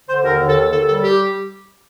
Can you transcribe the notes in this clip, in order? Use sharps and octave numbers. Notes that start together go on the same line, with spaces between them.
D3 C5
D#2 A#4
D#2
A4
D3
D#2 A4
G3 A4
G4